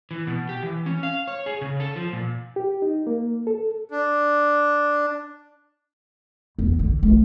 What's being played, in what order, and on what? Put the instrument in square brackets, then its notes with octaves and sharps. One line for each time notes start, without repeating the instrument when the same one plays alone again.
[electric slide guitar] E3
B2
G4
E3
C#4
F5
C#5
G#4
C#3
A4
F3
A#2
[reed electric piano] G4
D#4
A#3
A4
[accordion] D4
[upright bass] E2
D3
A3